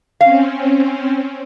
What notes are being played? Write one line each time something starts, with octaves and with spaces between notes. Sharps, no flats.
C4 C#4 F5